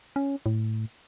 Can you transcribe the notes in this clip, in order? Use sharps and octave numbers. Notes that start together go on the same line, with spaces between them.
C#4
A2